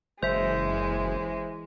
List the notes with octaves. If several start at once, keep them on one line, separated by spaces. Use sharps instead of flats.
F#1 E3 G#3 C5 E5